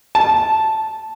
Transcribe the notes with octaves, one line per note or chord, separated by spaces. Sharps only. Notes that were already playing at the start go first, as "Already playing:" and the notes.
A5